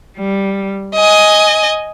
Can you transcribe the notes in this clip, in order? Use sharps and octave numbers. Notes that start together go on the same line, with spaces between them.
G3
D#5 G#5